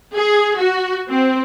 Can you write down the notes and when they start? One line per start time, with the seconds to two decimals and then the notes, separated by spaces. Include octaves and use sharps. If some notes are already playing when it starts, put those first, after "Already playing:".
0.14 G#4
0.58 F#4
1.11 C4